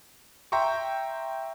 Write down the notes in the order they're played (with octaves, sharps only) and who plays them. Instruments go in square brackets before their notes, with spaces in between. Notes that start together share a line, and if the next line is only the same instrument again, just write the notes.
[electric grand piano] E5 G5 A#5 C6 C#6